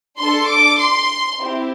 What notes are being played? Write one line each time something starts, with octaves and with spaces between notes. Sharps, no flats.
D4 A4 C6
D6
C6
C4 E4 G4